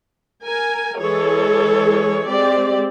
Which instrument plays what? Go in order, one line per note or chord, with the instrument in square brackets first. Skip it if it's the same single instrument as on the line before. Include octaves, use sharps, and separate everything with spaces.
[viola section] A#4 G#5
E3 G#3 G#4 A4 C#5
G#3 C4 G4 D5